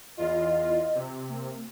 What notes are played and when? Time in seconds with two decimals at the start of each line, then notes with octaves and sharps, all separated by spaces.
0.17 E2 F4 D#5
0.95 C3
1.29 A#3